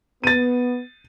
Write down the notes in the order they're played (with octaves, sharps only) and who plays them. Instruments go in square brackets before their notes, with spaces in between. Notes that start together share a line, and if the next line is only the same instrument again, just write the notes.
[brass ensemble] B3 [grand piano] A6 D#7